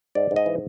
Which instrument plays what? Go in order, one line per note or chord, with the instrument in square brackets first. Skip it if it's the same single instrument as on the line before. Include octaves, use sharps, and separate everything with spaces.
[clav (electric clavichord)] G#2 D5
G#2
D#5
E3